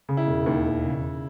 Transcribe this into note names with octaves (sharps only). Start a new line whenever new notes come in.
C#3
E4
E1
D#2
E1
C#3